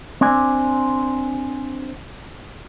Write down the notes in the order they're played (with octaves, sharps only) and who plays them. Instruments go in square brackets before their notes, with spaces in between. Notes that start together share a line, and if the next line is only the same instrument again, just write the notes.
[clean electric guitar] C4 D4 D5 G#5